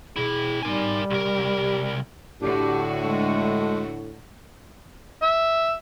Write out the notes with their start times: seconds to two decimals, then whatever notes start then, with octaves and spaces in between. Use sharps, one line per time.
0.16 B2 E4 G#4
0.63 G3 D#4 A#4 G#5
1.10 C2 G4 A#4
2.41 A2 D3 D4 F#4 G4
3.04 G#3 A3
5.22 E5